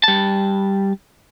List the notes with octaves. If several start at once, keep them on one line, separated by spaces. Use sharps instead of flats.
G3 A5